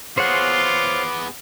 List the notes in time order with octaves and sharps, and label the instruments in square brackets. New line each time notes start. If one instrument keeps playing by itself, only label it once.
[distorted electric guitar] B3 G#4 [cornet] F4 [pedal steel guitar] C5 C#5 F#5 [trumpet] D6